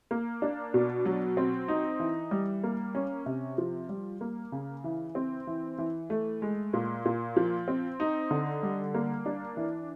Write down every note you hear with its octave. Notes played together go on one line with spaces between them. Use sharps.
A#3
D4
B2
F#3
C4
D#4
E3
G3
A#3
C#4
C3
F3
G3
A#3
C#3
E3
C4
E3
E3
A3
G#3
A#2
A#2
F3
C4
D#4
D3
G3
A#3
D4
E3